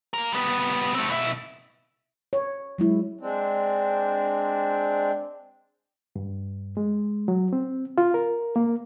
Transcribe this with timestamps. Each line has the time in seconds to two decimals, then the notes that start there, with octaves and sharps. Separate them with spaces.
0.14 A#3 A#4
0.32 G3 B3
0.94 A3 C4
1.09 B2 E4
2.33 C#5
2.78 F#3 G#3 E4
3.21 G#3 C4 D4
6.16 G2
6.77 G#3
7.28 F#3
7.53 C4
7.98 F4
8.14 A#4
8.56 A#3